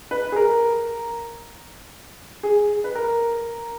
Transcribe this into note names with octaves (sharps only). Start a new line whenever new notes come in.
B4
G#4
A#4
G#4
B4
A#4